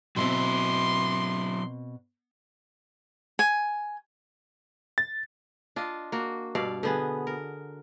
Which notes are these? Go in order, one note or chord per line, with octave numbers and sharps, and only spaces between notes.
B2 F#3 C4 E4 C6
G#5
A6
D4 F4 D#5
A#3 F#4
G2 B2 D5 F5
D3 B3 G#4
A#4